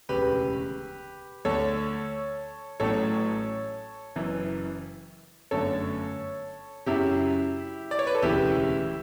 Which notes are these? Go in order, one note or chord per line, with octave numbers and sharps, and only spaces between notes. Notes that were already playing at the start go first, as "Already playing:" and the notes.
E1 D2 C#3 G4 B4
D2 D3 A3 A4 C#5
A1 A2 F#3 A3 A4 C#5
F#1 F#2 E3
G1 F#2 D3 A3 A4 C#5
F#2 C#3 F#3 E4 G4
D5
C#5
B4
A4
E1 D2 C#3 E3 E4 G4